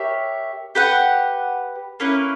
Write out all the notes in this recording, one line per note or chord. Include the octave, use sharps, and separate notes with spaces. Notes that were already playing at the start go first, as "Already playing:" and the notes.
Already playing: G4 A#4 C#5 E5
G4 B4 F#5
A#3 C#4 E4 B4